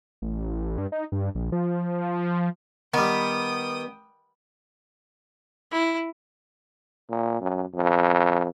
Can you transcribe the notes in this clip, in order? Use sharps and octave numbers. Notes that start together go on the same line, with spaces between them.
A1
G2
D#4
G2
A#1
F3
D#3 G3 B3 G5 D#6
E4
A#2
F#2
F2